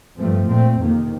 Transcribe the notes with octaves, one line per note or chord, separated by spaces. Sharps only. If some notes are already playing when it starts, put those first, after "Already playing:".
G2 F3 A3 C4
A#2 A3 C4
F2 C3 D#3 A#3